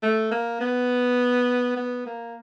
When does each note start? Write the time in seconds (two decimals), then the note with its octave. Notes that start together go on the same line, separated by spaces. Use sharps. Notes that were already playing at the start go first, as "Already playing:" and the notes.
0.03 A3
0.31 A#3
0.61 B3
1.76 B3
2.06 A#3